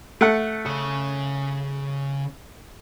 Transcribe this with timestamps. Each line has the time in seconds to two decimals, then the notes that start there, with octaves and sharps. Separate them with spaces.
0.21 A3 F#5
0.66 C#3 C#5